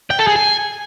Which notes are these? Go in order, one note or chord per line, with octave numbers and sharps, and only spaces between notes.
G5
A4
G#4
G#5